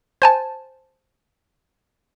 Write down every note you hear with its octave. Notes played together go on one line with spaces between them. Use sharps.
C5 G#5 A5